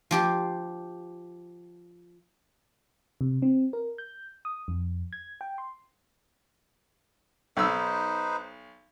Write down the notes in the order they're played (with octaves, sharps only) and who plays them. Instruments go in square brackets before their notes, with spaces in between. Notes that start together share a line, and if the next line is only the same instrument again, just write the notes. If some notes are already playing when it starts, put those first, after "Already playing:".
[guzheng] F3 G4 C6
[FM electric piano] C3
C4
A#4
G6
D#6
F2
G#6
G5
C6
[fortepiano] B1 E6 [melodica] D#4 B4 C5